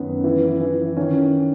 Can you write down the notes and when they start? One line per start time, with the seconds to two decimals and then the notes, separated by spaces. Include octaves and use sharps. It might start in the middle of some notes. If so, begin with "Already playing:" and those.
Already playing: F#2 D#3 B3
0.24 E3
0.61 E3
0.97 D#3 C#4